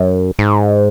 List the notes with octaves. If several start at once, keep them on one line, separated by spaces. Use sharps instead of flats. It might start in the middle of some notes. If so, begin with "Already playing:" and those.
Already playing: F#2
G#2